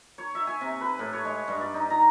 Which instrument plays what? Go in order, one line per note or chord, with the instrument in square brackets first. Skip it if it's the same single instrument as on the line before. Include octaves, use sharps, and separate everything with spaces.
[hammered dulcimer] C#5
E5
G#5
C3
B4
A2
C#5
G#3
G2
D5
D#4
A#5